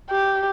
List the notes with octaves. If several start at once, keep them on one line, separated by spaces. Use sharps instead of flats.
G4